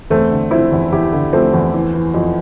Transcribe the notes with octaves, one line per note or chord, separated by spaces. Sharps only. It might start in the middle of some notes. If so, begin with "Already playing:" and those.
E2 A3 C4
D3
F3 C4 E4
E2
E2 E4 G4
D3
F3 A3 C4
E2
E3
E3
F2